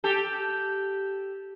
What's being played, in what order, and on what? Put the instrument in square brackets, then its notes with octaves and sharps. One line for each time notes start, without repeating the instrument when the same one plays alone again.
[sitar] G4 A4